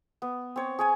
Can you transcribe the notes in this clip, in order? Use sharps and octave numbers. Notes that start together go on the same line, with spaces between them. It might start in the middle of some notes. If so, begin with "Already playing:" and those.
B3
C4 C#5
G#4 C#5 G#5